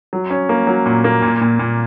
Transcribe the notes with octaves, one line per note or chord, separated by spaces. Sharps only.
F#3
C#4
A#3
F#3
A#2
A#3
A#2
A#2
A#2